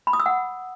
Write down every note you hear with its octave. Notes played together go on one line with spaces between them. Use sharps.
B5
D#6
E6
F#5